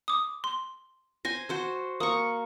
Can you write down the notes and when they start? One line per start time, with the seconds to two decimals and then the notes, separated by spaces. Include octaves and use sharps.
0.08 D6 D#6
0.44 C6
1.25 C5 G#5 A#6
1.49 F#4 C5 C6
2.00 A#3 C#6 D#6